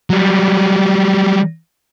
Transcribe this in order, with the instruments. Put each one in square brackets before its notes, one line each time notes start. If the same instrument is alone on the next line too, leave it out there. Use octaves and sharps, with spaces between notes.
[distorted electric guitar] F#3 G3